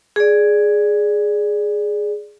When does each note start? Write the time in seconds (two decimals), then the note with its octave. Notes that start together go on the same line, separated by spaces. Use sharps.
0.16 G#4 D5